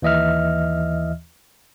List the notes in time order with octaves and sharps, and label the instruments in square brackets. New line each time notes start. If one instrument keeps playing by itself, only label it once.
[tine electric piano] D#2 E3 D#5 E5 F6